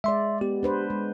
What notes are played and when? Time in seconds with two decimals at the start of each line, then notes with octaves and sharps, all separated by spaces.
0.04 G#3 D5 E5 C6
0.41 B3 G4
0.63 D4 B4 C5
0.90 G#3